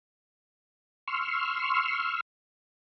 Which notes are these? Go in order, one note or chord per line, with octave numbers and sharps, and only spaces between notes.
C6 C#6 E6 F6